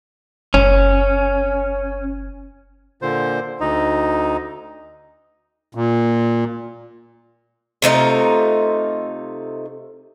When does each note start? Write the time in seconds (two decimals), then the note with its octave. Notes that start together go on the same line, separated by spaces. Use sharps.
0.54 F#1 C#4
3.02 A#2 D3 C5
3.60 D2 D#4
5.75 A#2
7.82 C3 A3 D#4 F4